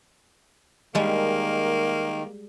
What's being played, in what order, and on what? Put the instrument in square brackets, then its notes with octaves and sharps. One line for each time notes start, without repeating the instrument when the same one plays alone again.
[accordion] D#3 [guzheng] G3 G#3 [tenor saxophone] A#3